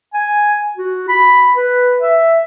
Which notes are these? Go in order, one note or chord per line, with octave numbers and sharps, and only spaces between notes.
G#5
F#4
B5
B4
E5